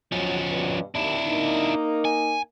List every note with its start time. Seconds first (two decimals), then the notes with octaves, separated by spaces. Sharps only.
0.12 F3 F#3 C#4
0.49 G2 B2
0.95 D#2 D4 E4
1.28 A#3 D#4
2.05 G#5